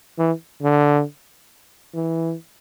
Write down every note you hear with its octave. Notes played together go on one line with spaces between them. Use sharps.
E3
D3
E3